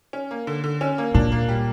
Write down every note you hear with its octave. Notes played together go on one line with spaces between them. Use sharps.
C#4
A#3
D3
D3
C#4
A#3
A#2 D4
A#3
G3